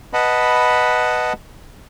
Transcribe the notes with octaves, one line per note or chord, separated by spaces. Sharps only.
B4 D#5 F#5 A5 B5